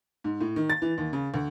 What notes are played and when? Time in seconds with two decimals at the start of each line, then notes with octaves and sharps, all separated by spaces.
0.24 G#2
0.41 A2
0.56 D#3
0.70 A6
0.82 E3
0.98 D#2
1.13 C#3
1.34 D2